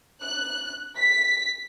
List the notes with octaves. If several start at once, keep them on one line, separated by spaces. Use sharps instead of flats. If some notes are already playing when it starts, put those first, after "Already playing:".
F#6
B6